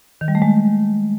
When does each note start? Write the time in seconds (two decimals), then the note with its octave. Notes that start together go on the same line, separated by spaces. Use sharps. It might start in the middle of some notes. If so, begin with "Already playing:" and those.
0.21 D#3
0.28 G3
0.35 A3
0.42 G#3